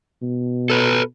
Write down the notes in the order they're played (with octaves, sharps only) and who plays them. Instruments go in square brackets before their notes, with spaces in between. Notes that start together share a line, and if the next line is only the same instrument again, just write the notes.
[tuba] B2
[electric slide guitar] A4 B4